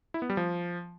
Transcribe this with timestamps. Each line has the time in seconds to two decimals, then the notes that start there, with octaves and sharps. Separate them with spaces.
0.14 E4
0.22 B3
0.30 G3
0.37 F3